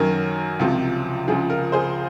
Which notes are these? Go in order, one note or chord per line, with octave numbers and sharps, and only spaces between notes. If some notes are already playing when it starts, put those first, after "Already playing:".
Already playing: F#2 D#3 F#3 A#4
C#2 C3 F3
C#2 C#3 F3 G#4
A#4
G#4 C5